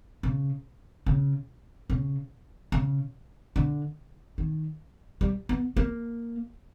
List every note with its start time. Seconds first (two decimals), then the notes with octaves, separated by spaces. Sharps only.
0.23 C#3
1.06 C#3
1.90 C#3
2.72 C#3
3.56 D3
4.38 D#3
5.21 G3
5.49 B3
5.77 A#3